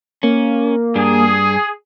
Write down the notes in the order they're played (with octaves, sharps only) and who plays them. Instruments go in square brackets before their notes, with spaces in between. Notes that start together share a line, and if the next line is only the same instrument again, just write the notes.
[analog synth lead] A#3 [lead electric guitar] C#4
[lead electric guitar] G2 D4 [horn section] G#4